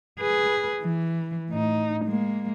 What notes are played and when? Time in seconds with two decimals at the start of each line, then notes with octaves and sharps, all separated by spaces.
0.19 G#4 B4
0.81 E3
1.50 A2 D#4
2.05 G#3 A#3